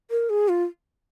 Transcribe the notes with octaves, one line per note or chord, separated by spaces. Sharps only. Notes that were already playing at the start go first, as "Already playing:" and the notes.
A#4
G#4
F4